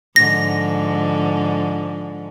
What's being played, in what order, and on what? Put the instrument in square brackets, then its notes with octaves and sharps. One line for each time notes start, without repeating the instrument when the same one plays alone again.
[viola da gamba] G#2 D3 F3 [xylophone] A#6